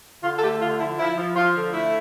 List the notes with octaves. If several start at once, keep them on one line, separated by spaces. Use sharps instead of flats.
D3 F4
A4
A3 G4
D3 F4
F3 E4
F3 E4
F3
F3 F4
D3
A3 E4